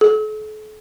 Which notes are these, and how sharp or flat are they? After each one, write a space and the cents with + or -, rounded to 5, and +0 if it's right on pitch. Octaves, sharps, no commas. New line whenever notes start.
A4 -40